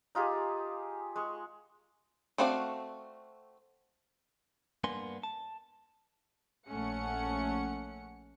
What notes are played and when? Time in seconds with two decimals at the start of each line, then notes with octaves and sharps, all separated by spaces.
0.15 D#4 F4 G4 G#4
1.16 G#3 C#6
2.38 A3 C4 F#4 D5 F5
4.84 G2 A#3 B3 D4 G#5 C6
5.23 A5
6.68 A#1 A3 C#4 F#5 C#7